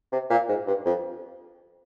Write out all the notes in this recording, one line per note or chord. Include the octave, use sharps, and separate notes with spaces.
C3
A#2
G#2
G2
F2